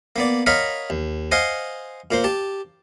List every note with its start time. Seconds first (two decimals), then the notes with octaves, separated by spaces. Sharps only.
0.16 A#3 B3 D5
0.46 A#4 C#5 D#5 F5 F#5 B5
0.90 D#2
1.32 C5 D#5 F5 F#5 G#5 C6
2.11 A#2 A#3 C5
2.24 G4 A5